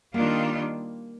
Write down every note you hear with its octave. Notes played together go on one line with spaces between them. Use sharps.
D#3 G3 A#3 D4 F4